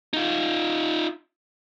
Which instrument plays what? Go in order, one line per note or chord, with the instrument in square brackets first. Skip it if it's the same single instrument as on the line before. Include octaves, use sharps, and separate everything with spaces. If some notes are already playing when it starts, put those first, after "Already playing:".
[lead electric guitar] D#4 F4